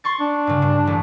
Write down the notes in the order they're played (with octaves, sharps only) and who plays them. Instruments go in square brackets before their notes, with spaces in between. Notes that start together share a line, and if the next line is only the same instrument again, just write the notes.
[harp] C6 C#6 A6
[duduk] D4
[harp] G2 C#3
G2
A1